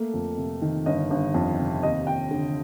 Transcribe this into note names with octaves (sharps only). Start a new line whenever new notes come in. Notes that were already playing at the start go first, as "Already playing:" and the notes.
Already playing: A3 A#3
F2
C3
D#3
G1 D#5
G1
F2
C3
D#2 D#5
D#2 G5
D3